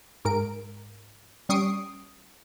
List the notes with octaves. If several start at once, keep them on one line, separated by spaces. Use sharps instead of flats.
G#2 A#4 D7
G3 C#4 C#6 D#6 C7 D7